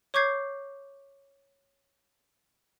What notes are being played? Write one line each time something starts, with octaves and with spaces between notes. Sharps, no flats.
C#5 C#6 D6 G6 G#6 C7